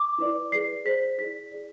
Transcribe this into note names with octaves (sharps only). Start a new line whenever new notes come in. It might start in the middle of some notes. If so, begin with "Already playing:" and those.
Already playing: D6
E4 B4 D5
G#4 B4 D5 C7
G#4 C5 B6
E4 G#4 D5 B6
G#4 D5